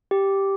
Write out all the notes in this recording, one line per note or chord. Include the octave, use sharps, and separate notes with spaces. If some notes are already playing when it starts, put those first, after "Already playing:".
G4